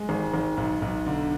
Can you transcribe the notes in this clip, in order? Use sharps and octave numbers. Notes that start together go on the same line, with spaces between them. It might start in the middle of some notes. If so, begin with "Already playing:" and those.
Already playing: G#3
G#1
G#1
B1
B1
D3